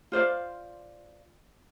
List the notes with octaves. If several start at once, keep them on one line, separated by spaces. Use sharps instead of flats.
F4 C5 D5 F5